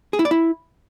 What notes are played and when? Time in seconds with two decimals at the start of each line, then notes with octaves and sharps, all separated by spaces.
0.13 G#4
0.19 E4
0.25 D5
0.31 E4